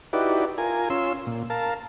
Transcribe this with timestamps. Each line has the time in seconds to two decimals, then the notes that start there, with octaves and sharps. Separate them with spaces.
0.13 D#4 E4 F#4 G4 B4 D5
0.58 F4 A#4 G#5
0.90 C#4 F4 C6 E6
1.27 A#2
1.50 A#4 F5 A5